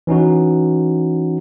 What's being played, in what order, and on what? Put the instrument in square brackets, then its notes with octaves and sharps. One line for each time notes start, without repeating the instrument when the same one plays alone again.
[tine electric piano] E3 C#4 D#4 F#4